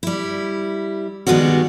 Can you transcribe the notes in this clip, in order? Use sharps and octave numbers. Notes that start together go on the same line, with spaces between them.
G3 E4
D#3 G3 G#3 B3 C#4 F#4